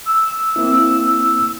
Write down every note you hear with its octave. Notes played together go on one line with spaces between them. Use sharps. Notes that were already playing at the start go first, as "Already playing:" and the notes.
E6
A#3 C4 E4